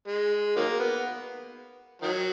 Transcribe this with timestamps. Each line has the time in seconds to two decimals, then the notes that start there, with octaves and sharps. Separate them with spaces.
0.08 G#3
0.56 D#3 F#3 A#3
0.80 B3
2.02 D#3 F#3